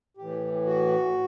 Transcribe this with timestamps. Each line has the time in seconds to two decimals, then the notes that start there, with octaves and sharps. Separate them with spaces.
0.17 A2 E3 G4
0.66 F#4